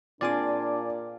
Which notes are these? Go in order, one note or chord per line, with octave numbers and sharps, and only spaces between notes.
A#2 C4 D4 F4 G#4 D5 G#5 D6